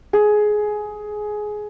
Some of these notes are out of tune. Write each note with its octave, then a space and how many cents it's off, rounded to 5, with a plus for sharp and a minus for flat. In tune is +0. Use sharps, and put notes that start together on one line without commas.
G#4 +15